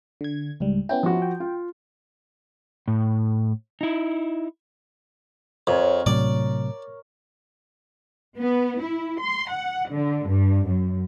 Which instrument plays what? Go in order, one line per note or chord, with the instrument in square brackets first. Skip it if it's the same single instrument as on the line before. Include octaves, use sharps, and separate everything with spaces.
[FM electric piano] D3 G#6
C#2 G#2 G3
[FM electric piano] B3 C#4 E4 [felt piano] G5
[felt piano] F3 F#4
[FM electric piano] G5
[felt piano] F4
[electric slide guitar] A2
D#4 E4
[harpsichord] F2 [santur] A#4 C#5
[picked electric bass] A2 C3 F#3 [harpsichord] D5
[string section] B3
E4
C6
F#5
D3
G2
F#2